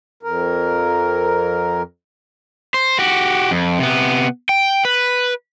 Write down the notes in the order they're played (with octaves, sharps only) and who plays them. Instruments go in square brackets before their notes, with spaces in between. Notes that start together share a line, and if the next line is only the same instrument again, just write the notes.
[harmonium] F2 A#4
[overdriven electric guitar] C5
F#4 G4
F2
C3 B3
G5
B4